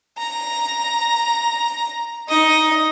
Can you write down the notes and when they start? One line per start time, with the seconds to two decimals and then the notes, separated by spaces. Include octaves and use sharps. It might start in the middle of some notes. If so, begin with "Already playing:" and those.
0.18 A#5
2.28 D#4 D#5